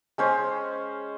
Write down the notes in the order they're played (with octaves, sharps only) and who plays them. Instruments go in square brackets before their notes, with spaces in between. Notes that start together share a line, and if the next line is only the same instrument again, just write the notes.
[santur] G#3 C#4 C5